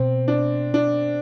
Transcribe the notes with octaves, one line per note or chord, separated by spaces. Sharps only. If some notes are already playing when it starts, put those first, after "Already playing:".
Already playing: B2 C4
D4
D4